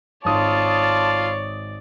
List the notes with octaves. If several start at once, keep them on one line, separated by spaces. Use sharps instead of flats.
G#1 F4 C#5 D5 A5 D#6